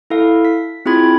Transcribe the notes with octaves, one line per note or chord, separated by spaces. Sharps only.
E4 A4 F5
B6
C4 E4 F4 G#4 B5 G#6